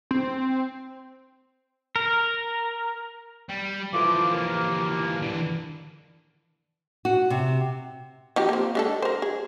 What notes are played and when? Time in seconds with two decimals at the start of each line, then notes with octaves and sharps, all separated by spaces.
0.11 C4
1.96 A#4
3.49 G3
3.93 E3 F3 A3 F4 D6
4.31 D#2 A#3
5.22 E3 D4
7.05 F#4
7.30 C3
8.36 F3 D#4 G4
8.49 A#3 C4
8.75 G#3 D4 A4
9.02 A#4 C5
9.22 G#4